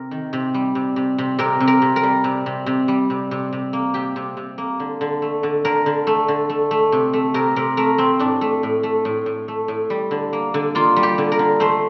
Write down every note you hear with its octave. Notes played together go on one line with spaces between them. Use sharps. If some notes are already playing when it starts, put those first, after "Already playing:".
Already playing: C3 A#4
D#3
C3
G3
C3
C3
C3
C3 A#4
C3
A#4
C3
A#4
G3
C3
C3
C3
G3
C3
C3
C3
A#3
C3 G4
C3
C3
A#3
D3
D3
A3
D3
D3 A#4
D3
A3
D3
A3
A3
C3
A3
C3 A#4
C3 A#4
A3 A#4
C3 C4
A2 D4
A3
A2
A3
A2
A2
A3
A2
G3
D3
A#3
D3
A#3 F4
G3
G4
D3
A#4
D3
A3 C5